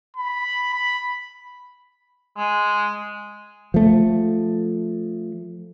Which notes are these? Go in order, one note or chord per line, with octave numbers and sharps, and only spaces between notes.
B5
B5
G#3
F3 A3